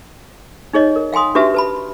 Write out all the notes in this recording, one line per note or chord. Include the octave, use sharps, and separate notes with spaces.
D#4 G#4 C#5 D#5
A#4
F5 G5 G#5 C6 D#6
D4 F#4 G4 B4 E5 A5
B4 A5 B5